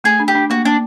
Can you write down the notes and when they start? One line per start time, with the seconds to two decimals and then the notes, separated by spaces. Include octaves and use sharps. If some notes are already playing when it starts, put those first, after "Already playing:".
0.04 A3 G#4
0.20 D4
0.28 G4
0.35 D4
0.50 A#3 F#4
0.65 A#3 D4